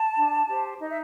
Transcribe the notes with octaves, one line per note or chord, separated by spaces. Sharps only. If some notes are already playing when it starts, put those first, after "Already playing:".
Already playing: A5
D4
G4 C5
D#4 D#5
E5